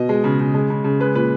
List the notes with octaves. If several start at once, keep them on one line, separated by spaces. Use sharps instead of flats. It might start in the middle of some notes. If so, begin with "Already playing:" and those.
Already playing: B2 D#5
G#3
C#3
C#3
G#3
C#3
C#3
G#3 B4
A#2 B4